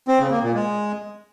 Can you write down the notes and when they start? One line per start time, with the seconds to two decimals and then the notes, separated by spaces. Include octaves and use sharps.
0.08 C4
0.20 C#3
0.31 A#3
0.43 A#2
0.54 G#3